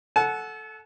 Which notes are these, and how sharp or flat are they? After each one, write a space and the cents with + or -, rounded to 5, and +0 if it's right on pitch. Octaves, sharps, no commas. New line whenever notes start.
A4 +0 F#5 -5 A5 -40